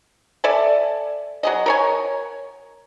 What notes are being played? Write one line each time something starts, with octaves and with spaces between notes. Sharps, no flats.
A4 D5 E5 G#5
F#3 G#4 D#5
A#4 C#5 G#5